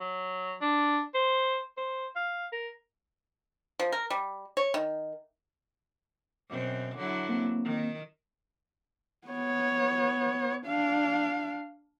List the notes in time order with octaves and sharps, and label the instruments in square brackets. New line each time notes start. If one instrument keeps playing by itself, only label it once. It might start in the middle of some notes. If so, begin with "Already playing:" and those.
[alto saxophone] F#3
D4
C5
C5
F5
A#4
[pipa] F3
A#4
G3
C#5
D#3
[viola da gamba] F#2 B2 C4
D3 F#3 E4
[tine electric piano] A#3 C4
[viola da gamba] D#3
[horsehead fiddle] B3 C#5
D4 F5